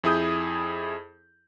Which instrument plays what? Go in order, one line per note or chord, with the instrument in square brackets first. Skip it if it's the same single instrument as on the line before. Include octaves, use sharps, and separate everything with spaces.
[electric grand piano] F2 E4 G#4 D#6 G6